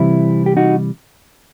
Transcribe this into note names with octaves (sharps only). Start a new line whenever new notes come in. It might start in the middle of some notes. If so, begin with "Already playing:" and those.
Already playing: C3 E3 G3 C4 E4
G4
D#4 F#4